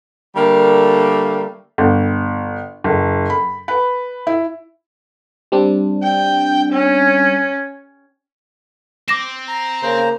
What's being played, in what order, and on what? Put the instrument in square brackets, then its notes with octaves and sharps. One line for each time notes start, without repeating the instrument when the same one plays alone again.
[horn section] D3 G3 A3 A#3
[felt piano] G1
F#1
B5
B4
E4
[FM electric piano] G3 C4 D4
[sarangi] G5
C#4
[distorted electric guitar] C4 [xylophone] D6 A#6 E7
[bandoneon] A#5
[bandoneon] C#3 C5 A#5 [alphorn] A#3